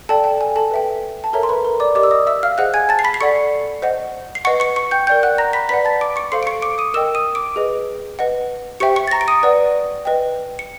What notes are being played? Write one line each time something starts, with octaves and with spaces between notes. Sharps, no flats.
A4 D5 G5 A5
G5
G#5
A4 A5
B4 E5 G5
A5
A4 A#4 C#5 E5 A#5
C6
B4 B5
A#4 A#5
D5 D6
G4 A#4 D5 D#5 D6
E6
D#5 D#6
E5 E6
F5 F6
G#4 C5 D#5 F#5 F#6
G#5 G#6
A5 A6
C7
B5 B6
C7
A4 D5 F#5 C#6 C#7
C5 D#5 F#5
C7
B4 D#5 F#5 C#6 C#7
C#6 C#7
C#6 C#7
G5 G6
A#4 D5 G5 G6
F#5 F#6
A#5 A#6
B5 B6
B4 D5 F#5 B5 B6
A5 A6
D6 D7
C#6 C#7
A4 C5 F5 C6 C7
D7
C#6 C#7
D6 D7
D#6 D#7
A#4 D#5 G5 E6 E7
D#6 D#7
D6 D7
G#4 B4 D#5
B4 D#5 F#5
G4 C5 E5 G5 C#6 C#7
C#6 C#7
A6
A#5 A#6
D7
D#6 D#7
B4 D5 F#5
B4 D#5 G5
C#7